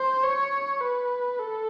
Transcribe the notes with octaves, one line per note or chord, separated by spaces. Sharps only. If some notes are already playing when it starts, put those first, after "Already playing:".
Already playing: C5
C#5
B4
A4